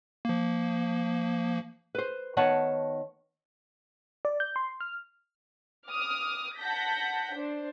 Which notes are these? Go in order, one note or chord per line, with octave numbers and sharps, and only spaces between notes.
F3 A#3
B4 C5
D#3 B3 C#5 F#5 A5
D5
G6
C6
F6
D6 D#6 F6
F#5 A5 G6 A#6 B6
D4 C5